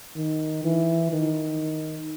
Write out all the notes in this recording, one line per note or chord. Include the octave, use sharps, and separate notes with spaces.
D#3
E3
D#3